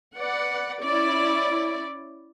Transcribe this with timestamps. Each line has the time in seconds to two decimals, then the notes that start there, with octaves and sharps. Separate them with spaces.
0.17 B4 D5 F#5
0.83 C#4 E4 D5